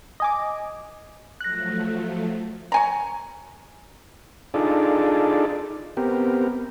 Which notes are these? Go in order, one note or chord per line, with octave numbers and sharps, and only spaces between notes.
D#5 G#5 D6
F3 F#3 A3 F#6 A#6
C#5 G#5 A#5
D4 D#4 F4 G#4 A4 D5
B3 C4 G4 A#4